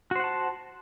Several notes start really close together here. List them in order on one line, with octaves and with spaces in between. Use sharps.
F#4 C5 F#5 A5